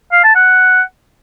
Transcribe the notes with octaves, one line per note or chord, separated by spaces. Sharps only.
F5
A5
F#5